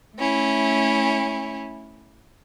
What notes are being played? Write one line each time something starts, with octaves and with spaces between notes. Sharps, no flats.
A3 C#4 E4